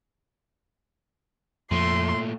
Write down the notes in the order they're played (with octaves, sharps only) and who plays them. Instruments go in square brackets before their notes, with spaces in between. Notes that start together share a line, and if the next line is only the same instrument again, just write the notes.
[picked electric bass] F2 F3 [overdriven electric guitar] A#2 A3 [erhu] C6